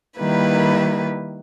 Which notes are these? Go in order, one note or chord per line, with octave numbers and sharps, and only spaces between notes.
D#3 G3 A#3 E4 B4